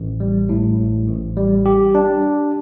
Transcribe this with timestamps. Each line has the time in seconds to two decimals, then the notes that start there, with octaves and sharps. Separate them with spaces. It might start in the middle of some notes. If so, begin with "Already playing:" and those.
Already playing: A1
0.20 G3
0.49 A2
0.78 A1
1.08 A1
1.37 G3
1.66 G4
1.95 D4